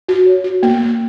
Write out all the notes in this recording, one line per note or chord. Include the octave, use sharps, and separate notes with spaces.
F#4
C#5
F#4
A#3
A#3